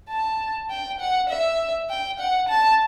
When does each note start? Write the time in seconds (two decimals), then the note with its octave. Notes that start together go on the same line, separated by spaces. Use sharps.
0.09 A5
0.70 G5
1.00 F#5
1.29 E5
1.90 G5
2.20 F#5
2.49 A5